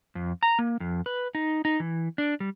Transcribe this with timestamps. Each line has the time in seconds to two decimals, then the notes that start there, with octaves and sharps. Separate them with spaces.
0.15 F2
0.43 A#5
0.59 A#3
0.80 F2
1.06 B4
1.35 D#4
1.65 D#4
1.80 E3
2.18 D4
2.40 G3